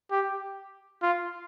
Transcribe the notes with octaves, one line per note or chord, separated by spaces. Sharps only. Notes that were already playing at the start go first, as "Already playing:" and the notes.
G4
F4